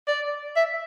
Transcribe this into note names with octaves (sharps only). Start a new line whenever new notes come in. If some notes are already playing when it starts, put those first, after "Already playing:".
D5
E5